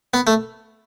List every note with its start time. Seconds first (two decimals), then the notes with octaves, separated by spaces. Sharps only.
0.14 B3
0.27 A3